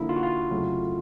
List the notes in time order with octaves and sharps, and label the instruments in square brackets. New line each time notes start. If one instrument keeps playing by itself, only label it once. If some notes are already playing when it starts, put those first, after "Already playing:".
Already playing: [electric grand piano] D3 F3 A#3 D#4 [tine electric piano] E4
[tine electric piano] F4
F#4
F4
[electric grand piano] F2 C#3 F#3 A3